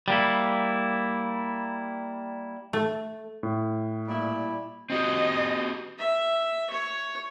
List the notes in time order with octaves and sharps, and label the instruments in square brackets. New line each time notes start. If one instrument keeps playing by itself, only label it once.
[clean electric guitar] G3 A#3 E4
[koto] A3
[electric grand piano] A2
[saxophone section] A#2 G3 E4
[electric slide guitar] C4 F#4 G4 [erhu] D#5
[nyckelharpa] E5
C#5